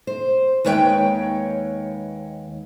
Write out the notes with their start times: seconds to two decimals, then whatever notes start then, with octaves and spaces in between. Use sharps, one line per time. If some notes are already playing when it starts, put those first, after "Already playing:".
0.07 C5
0.65 D#2 G#3 B4 C#5 F#5 G5